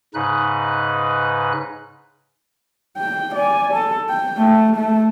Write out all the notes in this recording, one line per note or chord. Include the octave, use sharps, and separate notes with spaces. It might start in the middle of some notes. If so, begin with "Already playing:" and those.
G#2 C#3 D#4 B4 F#6
G5
D5 G#5
A4
G5
A3
A3